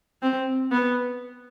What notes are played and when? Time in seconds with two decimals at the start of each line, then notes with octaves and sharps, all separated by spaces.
0.22 C4
0.72 B3